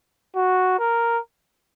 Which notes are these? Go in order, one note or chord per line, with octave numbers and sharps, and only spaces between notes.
F#4
A#4